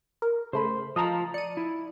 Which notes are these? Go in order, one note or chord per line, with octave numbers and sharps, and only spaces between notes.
A#4
C#3 A3 C5 B5
F3 F4 D#5 A5 A#5
D5 C#7 D#7
E4